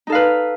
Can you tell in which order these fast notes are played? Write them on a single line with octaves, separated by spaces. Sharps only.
D#4 A4 F5 B4